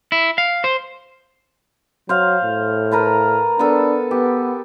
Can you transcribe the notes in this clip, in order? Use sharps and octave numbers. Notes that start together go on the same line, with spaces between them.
E4
F5
C5
F#3 C5 F5
A2
A#4 B4 A5
B3 D4 A4
B3 G4